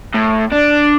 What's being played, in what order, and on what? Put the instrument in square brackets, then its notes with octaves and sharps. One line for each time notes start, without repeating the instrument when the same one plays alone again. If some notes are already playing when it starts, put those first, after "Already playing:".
[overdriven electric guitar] A2
D4